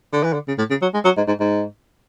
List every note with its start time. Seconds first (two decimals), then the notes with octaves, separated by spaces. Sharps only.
0.13 D3
0.24 E3
0.33 D3
0.48 C#3
0.58 A2
0.70 C#3
0.82 F#3
0.94 G#3
1.05 F#3
1.17 G#2
1.28 G#2
1.40 G#2